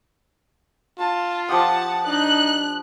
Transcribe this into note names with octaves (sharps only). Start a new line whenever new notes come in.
F4 A5
F3 G4 F#5 A5 D#6
D4 D#4 F#6